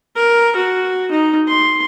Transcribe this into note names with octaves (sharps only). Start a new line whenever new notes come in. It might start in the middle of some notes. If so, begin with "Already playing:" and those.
A#4
F#4
D#4
C6